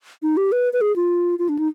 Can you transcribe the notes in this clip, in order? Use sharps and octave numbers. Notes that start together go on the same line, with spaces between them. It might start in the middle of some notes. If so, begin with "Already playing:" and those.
D#4
G4
B4
B4
G#4
F4
F4
D4
D#4